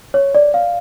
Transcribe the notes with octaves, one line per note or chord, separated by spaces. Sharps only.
C#5
D5
F5